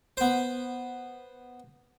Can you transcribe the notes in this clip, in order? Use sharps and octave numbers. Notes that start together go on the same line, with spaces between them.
B3 C5